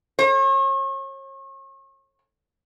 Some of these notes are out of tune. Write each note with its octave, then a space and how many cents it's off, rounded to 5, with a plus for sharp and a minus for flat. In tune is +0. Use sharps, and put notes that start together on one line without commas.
C#5 -40